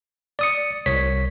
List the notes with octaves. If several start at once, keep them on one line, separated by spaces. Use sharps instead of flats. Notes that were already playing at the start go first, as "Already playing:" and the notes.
D5 D#6 C#7
C2 C#5 B6